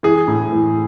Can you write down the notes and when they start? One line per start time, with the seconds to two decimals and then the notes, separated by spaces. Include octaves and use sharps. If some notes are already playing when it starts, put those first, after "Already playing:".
0.03 E3 G#4
0.28 A2
0.52 E3